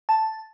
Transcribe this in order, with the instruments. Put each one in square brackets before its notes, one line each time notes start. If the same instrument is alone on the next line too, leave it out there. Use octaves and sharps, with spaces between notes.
[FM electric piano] A5